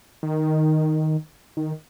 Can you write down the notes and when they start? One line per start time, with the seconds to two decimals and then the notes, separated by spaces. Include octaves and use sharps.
0.23 D#3
1.57 D#3